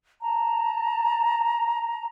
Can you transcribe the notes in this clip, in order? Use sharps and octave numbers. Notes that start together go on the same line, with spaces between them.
A5 A#5